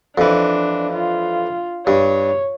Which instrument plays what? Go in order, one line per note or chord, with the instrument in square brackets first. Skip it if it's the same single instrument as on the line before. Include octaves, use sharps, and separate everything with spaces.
[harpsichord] F2 E3 [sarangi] D4
[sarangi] F4
[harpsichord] G2 [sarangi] C#5